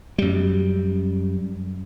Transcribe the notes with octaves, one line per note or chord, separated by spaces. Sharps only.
F#2 G3